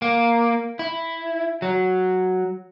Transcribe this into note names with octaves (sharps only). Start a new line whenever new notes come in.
A#3
E4
F#3